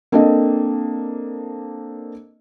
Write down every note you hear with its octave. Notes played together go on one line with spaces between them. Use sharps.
A#3 C4 D4 A4 D#5